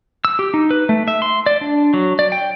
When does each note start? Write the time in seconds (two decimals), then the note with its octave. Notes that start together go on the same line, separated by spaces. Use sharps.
0.25 E6
0.39 G4
0.54 D#4
0.71 B4
0.89 A3
1.08 E5
1.22 C6
1.46 D5
1.61 D4
1.94 F#3
2.19 D5
2.32 G5